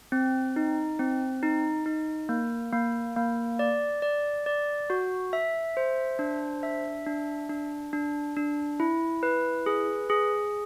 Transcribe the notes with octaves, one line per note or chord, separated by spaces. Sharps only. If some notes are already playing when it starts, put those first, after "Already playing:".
C4
D#4
C4
D#4
D#4
A#3
A#3
A#3
D5
D5
D5
F#4
E5
C5
D4
E5
D4
D4
D4
D4
E4
B4
G#4
G#4